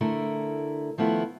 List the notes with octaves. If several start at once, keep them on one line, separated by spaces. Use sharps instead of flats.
D3 A3 E4 A#4
D#3 F3 A3 B3 E4